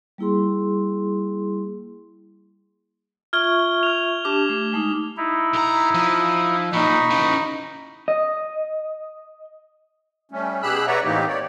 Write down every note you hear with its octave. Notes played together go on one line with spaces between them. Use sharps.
G3 A#3 E4 G#4 C6
F4 E5 C#6 F6 G#6 G7
F6 F7
D4 G4 A5 D6
A3
G#3 A3 D#4
D#4 E4
B1 A#5
F3
B1 A#2 D#4 B5 C#6
C#3 E3
D#5
G3 A3 C#4
B2 G4 G#4 B5 E6 F#6
B4 C#5 D5 E5 F#5 A#5
A2 E3 A#3 C4 D#4 G4
C#5 D5